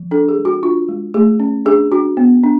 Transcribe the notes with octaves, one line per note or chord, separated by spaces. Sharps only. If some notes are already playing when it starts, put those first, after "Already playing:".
Already playing: F3
D4 A4
G#4
G#3
F#4
D4 F4
G#3
A3 G#4
C#4
D4 G#4
D4 F#4
B3
D4